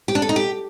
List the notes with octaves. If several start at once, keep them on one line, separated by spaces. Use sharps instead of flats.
G4
D4
A4
D#4
G4